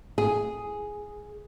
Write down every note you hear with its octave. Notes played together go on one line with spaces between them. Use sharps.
G#4